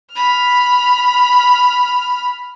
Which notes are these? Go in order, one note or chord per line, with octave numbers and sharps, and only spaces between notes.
B5 F6